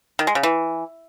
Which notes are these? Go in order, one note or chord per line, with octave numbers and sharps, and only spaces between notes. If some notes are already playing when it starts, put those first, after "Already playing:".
D#3
G#3
C#3
E3